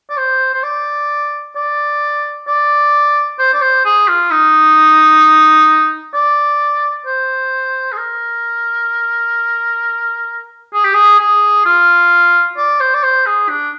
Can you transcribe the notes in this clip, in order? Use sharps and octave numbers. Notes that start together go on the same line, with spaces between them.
D5
C5
C5
D5
D5
D5
C5
D5
C5
G#4
F4
D#4
D5
C5
G#4
A#4
G#4
G4
G#4
G#4
F4
D5
C5
D5
C5
G#4
D4